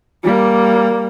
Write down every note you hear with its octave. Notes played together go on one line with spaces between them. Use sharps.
G3 A#3